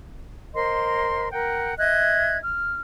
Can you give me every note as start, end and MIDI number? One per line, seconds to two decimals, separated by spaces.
0.54 1.28 70
0.54 1.28 72
0.54 1.28 75
0.54 1.28 84
1.30 1.75 70
1.30 1.75 78
1.30 1.75 79
1.78 2.37 75
1.78 2.37 76
1.78 2.37 90
1.78 2.37 92
2.43 2.80 89